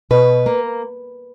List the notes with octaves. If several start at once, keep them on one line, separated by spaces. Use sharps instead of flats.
B2 B4
A#3